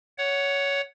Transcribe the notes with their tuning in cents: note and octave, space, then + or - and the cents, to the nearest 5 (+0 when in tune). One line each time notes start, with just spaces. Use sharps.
C#5 +15 F#5 +0